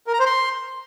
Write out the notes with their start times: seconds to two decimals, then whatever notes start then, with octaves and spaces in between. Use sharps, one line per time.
0.07 A#4
0.13 A#5
0.20 C5
0.26 C6